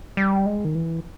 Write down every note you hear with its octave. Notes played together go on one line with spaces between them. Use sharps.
G3
G#3
D#3
E3